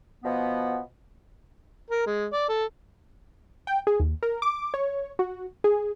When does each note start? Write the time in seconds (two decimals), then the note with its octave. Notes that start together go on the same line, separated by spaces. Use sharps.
0.24 B2 F3 B3
1.90 A#4
2.06 G#3
2.33 D5
2.49 A4
3.67 G5
3.87 G#4
4.00 D#2
4.23 A#4
4.42 D6
4.74 C#5
5.19 F#4
5.64 G#4